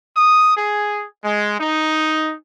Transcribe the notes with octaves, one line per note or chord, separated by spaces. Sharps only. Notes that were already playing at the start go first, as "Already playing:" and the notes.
D#6
G#4
G#3
D#4